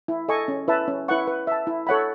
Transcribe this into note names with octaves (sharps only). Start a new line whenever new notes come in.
E4
A4 D#5 G#5 C#6
C#4
E4 B4 E5 A5
C#4
E4 B4 F#5 C#6
B4
E5 A5
E4
A4 C#5 F#5 B5